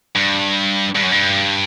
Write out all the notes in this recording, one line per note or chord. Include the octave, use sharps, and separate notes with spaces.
G2
G2
F#2
G2